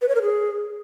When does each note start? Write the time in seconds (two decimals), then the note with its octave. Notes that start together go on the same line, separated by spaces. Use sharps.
0.02 B4
0.08 C#5
0.15 A#4
0.22 G#4